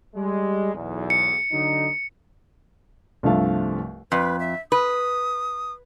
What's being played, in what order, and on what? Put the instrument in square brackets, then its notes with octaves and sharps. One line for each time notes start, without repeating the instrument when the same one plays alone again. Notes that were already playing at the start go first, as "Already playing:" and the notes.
[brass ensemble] G3 G#3
B1 E2
[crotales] C#7
[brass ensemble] D3 F#3 D#4
[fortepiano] C2 G2 F3 A3 F5
[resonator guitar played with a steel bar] F2 [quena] B4
[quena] E5
[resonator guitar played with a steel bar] B4 [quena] D#6